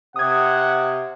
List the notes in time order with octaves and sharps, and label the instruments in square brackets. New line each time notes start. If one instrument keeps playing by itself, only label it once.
[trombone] C3 [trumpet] F#5 [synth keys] D#6 G#6